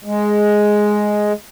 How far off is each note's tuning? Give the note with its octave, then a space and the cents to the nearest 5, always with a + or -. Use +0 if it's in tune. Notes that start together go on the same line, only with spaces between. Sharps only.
G#3 +5